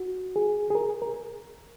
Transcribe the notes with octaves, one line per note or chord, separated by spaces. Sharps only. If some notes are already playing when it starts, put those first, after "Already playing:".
Already playing: F#4
G#4
G#4
A#4
A#4